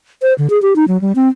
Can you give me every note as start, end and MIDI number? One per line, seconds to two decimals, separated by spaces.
0.22 0.34 72
0.38 0.47 50
0.50 0.60 68
0.62 0.76 67
0.76 0.85 63
0.88 1.00 54
1.01 1.12 55
1.16 1.28 60